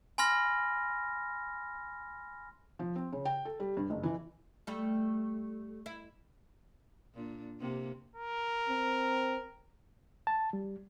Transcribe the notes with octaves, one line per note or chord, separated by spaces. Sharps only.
G#5 B5 C6 F6 A#6
F3
C4
C#3
G5
A4
G3
G2
F#1
E3
G3 A3
E4
A#2 D4
C3 A#3
A#4
C4
A5
G3